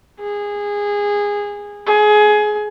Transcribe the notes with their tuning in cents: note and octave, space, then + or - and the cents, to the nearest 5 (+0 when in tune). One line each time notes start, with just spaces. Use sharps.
G#4 -20
G#4 +20